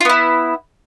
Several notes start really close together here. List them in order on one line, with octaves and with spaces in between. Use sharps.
F4 B3 E4